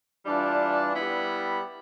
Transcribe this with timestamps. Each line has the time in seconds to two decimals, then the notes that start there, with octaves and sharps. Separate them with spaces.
0.24 E3 G3 D4 F4
0.93 G3 B3 E4